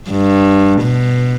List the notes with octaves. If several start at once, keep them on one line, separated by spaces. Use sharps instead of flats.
G2
B2